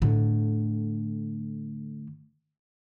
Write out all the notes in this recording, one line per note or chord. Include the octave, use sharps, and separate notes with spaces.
A2 D3